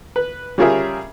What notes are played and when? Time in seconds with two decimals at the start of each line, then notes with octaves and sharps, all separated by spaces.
0.16 B4
0.58 G3 C#4 F4 G#4 A#4 E5